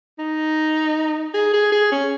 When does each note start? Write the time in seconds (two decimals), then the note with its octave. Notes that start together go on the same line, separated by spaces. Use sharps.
0.19 D#4
1.34 G#4
1.54 G#4
1.72 G#4
1.92 C#4